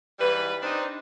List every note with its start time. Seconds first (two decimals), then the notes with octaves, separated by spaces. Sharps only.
0.20 G#2 E3 G3 B4
0.62 C4 D4 D#4